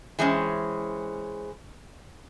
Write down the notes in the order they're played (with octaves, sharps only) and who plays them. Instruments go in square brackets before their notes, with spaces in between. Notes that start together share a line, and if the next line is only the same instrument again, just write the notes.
[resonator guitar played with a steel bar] E3 G#3 C4 C#4